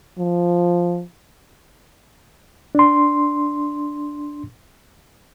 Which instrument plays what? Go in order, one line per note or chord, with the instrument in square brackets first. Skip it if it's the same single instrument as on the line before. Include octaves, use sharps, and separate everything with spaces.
[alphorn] F3
[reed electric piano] D4 C6